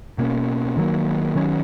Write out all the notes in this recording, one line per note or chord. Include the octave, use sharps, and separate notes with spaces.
B2 A#3 C#4
D#3 F#3 A#3
D#3 F#3 C#4